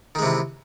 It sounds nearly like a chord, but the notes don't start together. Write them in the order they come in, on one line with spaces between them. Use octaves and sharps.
D#3 G#3 C3 E3